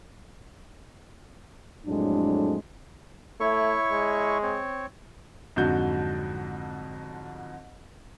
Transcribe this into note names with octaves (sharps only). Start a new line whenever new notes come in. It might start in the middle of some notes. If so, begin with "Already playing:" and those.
F2 A2 F#3 G#3 D4
A3 E4 C#5 C#6
G#3
C4 C#5
F2 G#2 D3 F#3 F#4 G6